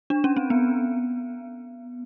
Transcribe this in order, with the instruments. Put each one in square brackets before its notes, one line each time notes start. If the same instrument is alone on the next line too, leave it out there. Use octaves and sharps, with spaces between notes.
[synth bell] D4
C#4
C4
B3